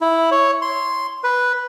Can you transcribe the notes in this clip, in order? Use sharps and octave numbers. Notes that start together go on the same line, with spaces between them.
E4
C#5
C6
B4